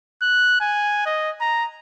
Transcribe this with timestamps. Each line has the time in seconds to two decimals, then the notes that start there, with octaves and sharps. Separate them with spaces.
0.22 F#6
0.61 G#5
1.06 D#5
1.41 A#5